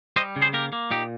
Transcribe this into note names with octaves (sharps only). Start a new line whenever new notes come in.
G3 C5 D#5
C#3
G#4 C5
A#3 G4 A#4
A#3
A#2 D#4 G4